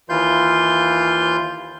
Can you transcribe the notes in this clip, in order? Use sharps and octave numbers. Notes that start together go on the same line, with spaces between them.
D#2 E3 F4 C6 G6